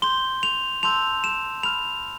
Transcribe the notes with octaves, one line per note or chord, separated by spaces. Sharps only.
C6 G6 G7
F7
A5 C6 E6 G6 F7
E7
B5 F6 F7